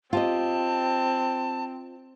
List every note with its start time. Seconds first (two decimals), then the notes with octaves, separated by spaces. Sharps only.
0.13 C4 F4 G4 D#5 A5